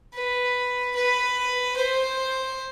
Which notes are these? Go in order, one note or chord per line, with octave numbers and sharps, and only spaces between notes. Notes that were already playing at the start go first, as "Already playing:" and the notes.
B4
B4
C5